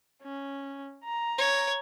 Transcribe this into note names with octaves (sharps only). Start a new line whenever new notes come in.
C#4
A#5
C#5